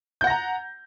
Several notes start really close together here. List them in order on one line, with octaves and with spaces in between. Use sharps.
G6 F#5 A#6 A#5